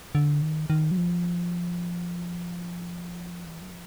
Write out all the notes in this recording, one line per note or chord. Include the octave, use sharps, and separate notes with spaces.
D3
D#3
D#3
F#3
F3
E3
F#3
F3